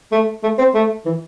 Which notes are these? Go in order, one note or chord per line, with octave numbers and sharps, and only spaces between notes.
A3
A3
C4
A3
E3